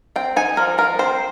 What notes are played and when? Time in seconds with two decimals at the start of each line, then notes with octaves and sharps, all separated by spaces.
0.16 C4 G5
0.36 D#4 G#5
0.57 F3 A#4
0.78 F3 A#4
0.99 C4 C5